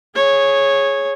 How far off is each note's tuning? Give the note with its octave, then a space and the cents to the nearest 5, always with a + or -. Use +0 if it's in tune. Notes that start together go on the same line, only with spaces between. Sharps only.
G#4 +0 C#5 -10